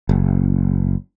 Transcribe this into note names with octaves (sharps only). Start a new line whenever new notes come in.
F#1